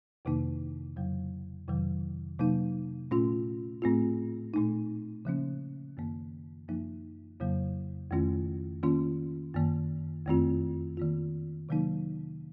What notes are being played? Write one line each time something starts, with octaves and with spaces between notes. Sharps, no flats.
F2 C3 D#3 A#3 D#4
F2 C#3 F#3
F2 C3 D#3 F#3
C3 F#3 A#3 D#4
A#2 A3 C#4 F4
A2 A3 C4 F4
A#2 A3 D#4
C#3 F3 A#3 C#4
F#2 D#3 A#3
F#2 F3 A#3 D#4
F2 C#3 F#3 A#3
F2 D#3 A3 C#4 F4
D#3 A#3 C#4 F4
F#2 D#3 A#3
F2 D#3 A3 C4 F4
D#3 A#3 F4
C3 D#3 F#3 A#3 D#4